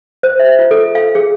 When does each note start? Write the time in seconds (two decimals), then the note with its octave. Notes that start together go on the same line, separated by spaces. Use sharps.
0.23 C5
0.39 E5
0.59 F4
0.71 A4
0.95 F5
1.15 G#4